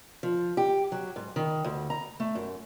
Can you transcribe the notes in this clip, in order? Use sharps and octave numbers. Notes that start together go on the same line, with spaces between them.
F3
G4
F#3
G#2
D#3
D2
A#5
A3
F#2